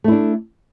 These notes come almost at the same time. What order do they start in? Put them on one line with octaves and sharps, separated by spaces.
A3 E4 D4